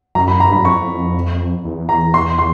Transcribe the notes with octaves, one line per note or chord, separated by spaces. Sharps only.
F#2 A#5
B5
F#2 A#5
G2
B5
F#2
F2 C#6
E2
A#5
C6
C6